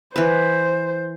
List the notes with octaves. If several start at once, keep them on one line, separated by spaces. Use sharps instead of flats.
E3 B4 C5